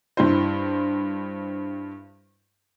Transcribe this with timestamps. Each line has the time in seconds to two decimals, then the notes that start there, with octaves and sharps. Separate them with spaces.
0.17 G2 E4 C5